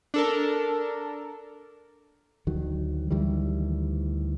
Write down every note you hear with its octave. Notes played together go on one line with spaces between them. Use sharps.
D4 A4 A#4
D2 D#3 F#3
D2 D#3 E3 G3